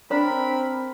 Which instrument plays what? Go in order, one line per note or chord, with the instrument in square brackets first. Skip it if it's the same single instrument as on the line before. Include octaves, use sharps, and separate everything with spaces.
[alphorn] C4 [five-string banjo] D4 [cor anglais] A#4 [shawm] B5